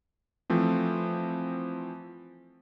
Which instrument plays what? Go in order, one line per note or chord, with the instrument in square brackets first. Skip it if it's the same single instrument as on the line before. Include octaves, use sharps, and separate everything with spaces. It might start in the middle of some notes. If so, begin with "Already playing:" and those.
[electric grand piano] E3 F3 A3 C4